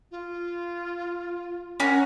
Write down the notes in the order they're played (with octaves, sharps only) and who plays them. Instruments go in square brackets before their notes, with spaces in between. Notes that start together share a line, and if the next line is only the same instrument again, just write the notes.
[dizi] F4
[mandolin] C#4 A#4 [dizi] F#5